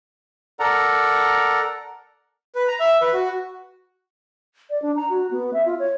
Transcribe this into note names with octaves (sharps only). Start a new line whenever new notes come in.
A4 A#4 D5 F#5 A#5
B4
A#5
E5
B4
F#4
D5
D4
A#5
F#4
B3
E5
F4
C#5